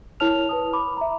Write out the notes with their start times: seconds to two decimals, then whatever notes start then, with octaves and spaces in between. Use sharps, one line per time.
0.20 E4 A#4 C#5 A5 F6 F7
0.49 B4 A5 D#6
0.73 B5 D6
0.97 E5 A#5